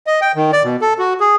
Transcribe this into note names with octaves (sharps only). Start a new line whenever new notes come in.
D#5
G5
D#3
D5
B2
A4
F#4
G#4